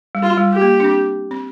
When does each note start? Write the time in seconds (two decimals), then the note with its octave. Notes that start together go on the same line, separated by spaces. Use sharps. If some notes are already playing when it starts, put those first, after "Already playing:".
0.15 G3
0.23 F4
0.37 G3
0.54 G4
0.62 A#3
0.80 D4
0.84 C4
1.31 C4